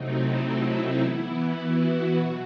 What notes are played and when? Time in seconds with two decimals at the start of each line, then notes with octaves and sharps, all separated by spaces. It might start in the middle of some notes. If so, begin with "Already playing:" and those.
Already playing: C3 F#3 A3 C4 D#4
0.12 E4
0.98 E3 B3
1.56 F#4
2.13 B2 F#3